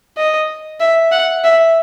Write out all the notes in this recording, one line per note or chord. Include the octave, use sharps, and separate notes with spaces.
D#5
E5
F#5
E5